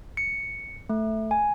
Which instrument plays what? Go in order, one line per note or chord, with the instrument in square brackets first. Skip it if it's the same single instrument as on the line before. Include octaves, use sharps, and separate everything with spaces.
[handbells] C#7
A3
G#5